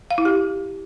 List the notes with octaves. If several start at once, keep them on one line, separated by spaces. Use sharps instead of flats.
F5
E4
G4